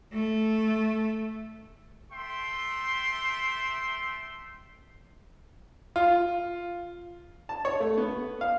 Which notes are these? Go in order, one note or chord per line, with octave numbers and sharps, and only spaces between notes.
A3
A3 E5 G5 C6
F4
A5
C#5
A3
B3
F5